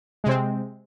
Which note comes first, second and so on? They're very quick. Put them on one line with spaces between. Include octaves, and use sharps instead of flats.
G#3 C3 C4